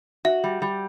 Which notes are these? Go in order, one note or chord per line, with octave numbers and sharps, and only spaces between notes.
F#4 E5
G3
G3